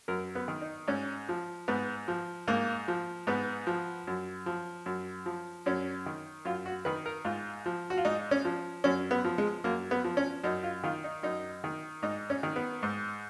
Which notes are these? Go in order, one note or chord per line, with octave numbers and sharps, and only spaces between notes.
F#2 A#4
B3
D#3
D#4
G#2 C#4
F3
G#2 B3
F3
G#2 A#3
F3
G#2 B3
F3
F#2
F3
F#2
F3
F#2 C#4
D#3
F#2 F4
F#4
D#3 B4
A#4
G#2 F4
F3
F#4
F4
G#2 D#4
C#4
F3
F#2 C#4
B3
F3
G#3
F#2 A#3
B3
F3
C#4
F#2 D#4
F4
D#3 F4
D#4
F#2 D#4
D#3
G#2 D#4
C#4
D#3
B3
G#2